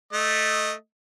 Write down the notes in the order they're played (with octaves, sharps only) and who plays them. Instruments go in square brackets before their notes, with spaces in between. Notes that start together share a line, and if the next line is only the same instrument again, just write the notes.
[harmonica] A3 D#5